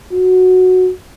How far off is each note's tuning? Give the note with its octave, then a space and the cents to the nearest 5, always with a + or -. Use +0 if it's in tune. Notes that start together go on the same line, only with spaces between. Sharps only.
F#4 -5